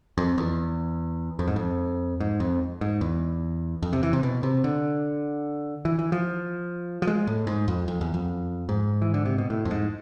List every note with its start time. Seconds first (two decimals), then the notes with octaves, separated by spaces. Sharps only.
0.18 F2
0.38 E2
1.39 F2
1.48 G#2
1.56 F2
2.20 G#2
2.40 F2
2.81 G#2
3.01 E2
3.82 F2
3.93 C3
4.03 E3
4.13 C3
4.23 B2
4.43 C3
4.64 D3
5.85 E3
5.99 E3
6.12 F3
7.02 F3
7.07 G#3
7.27 A2
7.47 G#2
7.68 F2
7.88 F2
8.01 E2
8.14 F2
8.69 G#2
9.02 E3
9.14 D3
9.25 C3
9.38 B2
9.50 A2
9.65 F2
9.71 G#2